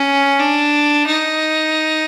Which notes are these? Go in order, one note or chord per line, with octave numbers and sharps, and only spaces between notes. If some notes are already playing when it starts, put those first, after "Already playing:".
Already playing: C#4
D4
D#4